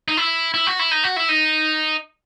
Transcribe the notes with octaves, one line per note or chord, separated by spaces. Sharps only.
D#4
E4
E4
F#4
E4
D#4
F#4
E4
D#4